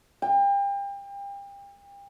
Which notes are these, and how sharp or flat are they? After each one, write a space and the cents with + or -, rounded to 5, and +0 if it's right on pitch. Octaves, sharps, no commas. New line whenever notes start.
G5 +35